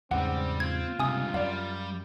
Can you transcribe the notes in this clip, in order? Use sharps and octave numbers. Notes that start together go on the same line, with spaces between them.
E2 G#2 C#3 G3 C4 G4 F#5
C4 F4 G#6
C#2 G2 C3 G#5 D#6
F#2 G3 D5 F5